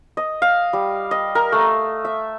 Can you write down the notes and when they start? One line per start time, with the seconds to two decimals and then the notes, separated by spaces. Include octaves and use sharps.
0.17 D#5
0.42 F5
0.73 G3
1.11 D#5
1.35 A#4
1.52 A3
2.05 E5